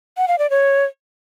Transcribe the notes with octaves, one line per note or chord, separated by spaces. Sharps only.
F#5
F5
D5
C#5